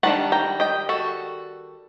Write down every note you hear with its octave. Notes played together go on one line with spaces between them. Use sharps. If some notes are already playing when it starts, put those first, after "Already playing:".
D#3 G3 D4 F#5 A5
G5 A#5
D#5 G5
F#4 A4